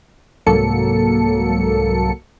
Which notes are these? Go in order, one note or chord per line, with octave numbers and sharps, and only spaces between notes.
C2 G#2 F#3 A#3 A4 C#7